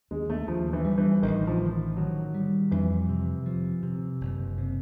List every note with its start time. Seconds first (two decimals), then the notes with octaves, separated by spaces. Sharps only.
0.11 D#2 G#3
0.30 A3
0.48 D#2 F3
0.73 E3
0.85 G3
0.98 E3
1.22 A1 D#3
1.47 F3
1.60 D#3
1.97 D#3 F#3
2.34 G3
2.71 F2 E3
3.09 C3
3.46 F3
3.83 C3
4.21 F#1
4.58 C3